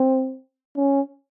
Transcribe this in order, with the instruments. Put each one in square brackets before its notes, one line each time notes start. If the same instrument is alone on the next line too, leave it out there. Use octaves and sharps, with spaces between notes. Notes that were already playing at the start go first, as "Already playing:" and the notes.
Already playing: [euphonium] C4
C#4